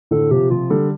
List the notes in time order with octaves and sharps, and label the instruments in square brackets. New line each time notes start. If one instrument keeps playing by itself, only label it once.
[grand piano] A2 D3 [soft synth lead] A4
[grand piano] C3 F3 [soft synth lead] G4
[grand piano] C3 F3 [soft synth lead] F4
[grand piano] D3 G3 [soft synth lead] A4